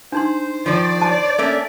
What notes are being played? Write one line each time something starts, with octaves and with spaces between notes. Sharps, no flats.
D4 D#4 C5 C6
D#3 F3 D5
A5
A3 A#3 C#4 E5